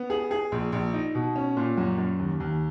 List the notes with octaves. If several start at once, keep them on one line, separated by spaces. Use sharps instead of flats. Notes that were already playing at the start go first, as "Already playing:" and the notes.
Already playing: B3
G#4
G#4
A#1
A#1
D#4
B2
C#4
A#2
F#2
F#2
D#2
D#2